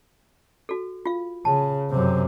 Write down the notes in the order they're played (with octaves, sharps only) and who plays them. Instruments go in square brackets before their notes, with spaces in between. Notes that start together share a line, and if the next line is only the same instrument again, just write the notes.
[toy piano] F#4 A4
F4 F5
[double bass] C#3 [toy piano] A5
[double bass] F#2 C3